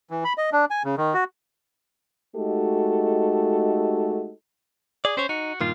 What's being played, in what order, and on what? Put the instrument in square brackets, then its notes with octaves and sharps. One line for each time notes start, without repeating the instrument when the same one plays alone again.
[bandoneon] E3
B5
D#5
D4
G#5
C#3
D#3
F#4
[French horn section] G#3 A3 D#4 F#4 G4 A4
[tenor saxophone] G#4 [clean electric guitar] D5
[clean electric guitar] C#4 C#5 [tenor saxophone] C5
[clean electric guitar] D#4 [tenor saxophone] F#4
[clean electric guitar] G2 A#2 D#3 [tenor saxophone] F4